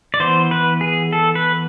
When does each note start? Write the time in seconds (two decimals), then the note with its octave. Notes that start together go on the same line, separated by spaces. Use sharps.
0.14 D5
0.20 E3 B3 C5
0.51 B4
0.81 G#4
1.13 A4
1.35 B4